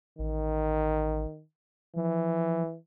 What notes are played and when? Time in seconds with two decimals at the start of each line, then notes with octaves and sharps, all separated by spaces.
0.19 A1 D#3
1.96 E3 F3